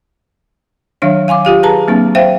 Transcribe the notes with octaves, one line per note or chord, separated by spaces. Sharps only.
D#3 F#3 D4 C#5 F5
F5 G#5 C6 D6
F4 G4 F5
G#4 B4 A5 A#5
F#3 A#3 C4 D4
C5 E5 F5 G5